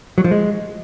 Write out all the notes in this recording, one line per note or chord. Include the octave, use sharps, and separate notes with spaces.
F#3
F3
G#3